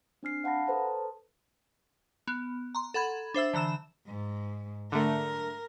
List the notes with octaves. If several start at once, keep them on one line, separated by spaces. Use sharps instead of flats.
C4 D4 F6 C7
F5 F#5 A5 B5 A#6
A4 B4 C5 A5 A#5
B3
A#5 C6
A4 F#5 B5 G#6
D4 C5 E5 E6
D3 E3 A#5 E6 E7
G#2
D3 A3 A#4